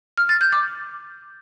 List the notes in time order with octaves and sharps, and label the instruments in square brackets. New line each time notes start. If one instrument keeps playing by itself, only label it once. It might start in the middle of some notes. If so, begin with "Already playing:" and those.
[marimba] F6
A6
G6
D6